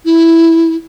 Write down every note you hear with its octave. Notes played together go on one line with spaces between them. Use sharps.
E4